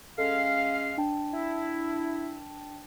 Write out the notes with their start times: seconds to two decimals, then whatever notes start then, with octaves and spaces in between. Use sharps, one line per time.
0.18 G#3 C#4 A4 F5
0.38 C7
0.98 D4 G5 A5
1.32 E4